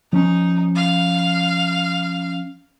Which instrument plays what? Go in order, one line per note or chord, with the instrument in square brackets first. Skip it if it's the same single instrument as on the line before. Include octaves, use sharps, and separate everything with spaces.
[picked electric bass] F3 C#4 [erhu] D#4
[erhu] F5